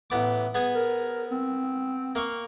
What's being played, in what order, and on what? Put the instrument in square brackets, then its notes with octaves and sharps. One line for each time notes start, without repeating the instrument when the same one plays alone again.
[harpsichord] A1 B3 D6
B3 G#4 G#5
[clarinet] A#4
C4
[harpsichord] A#3 F5 C#6